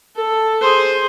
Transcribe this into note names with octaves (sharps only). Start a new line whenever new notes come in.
A4
G#4 C5